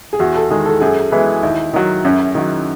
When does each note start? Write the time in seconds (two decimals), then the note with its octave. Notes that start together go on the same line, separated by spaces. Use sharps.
0.13 G#4
0.19 E2 F#4
0.36 A4
0.50 D#3 G#3 G#4
0.66 A4
0.81 F#2 G#4
1.12 E3 G#3 B3 E4
1.43 D#2 E4
1.74 D#3 F#3
2.05 F#2 C#4
2.35 D#3 F#3